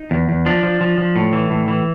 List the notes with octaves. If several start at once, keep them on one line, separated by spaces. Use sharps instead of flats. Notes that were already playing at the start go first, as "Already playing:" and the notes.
Already playing: D#4
E2
E2
F3 D4
F3
F3
F3
A2
E3
A2
E3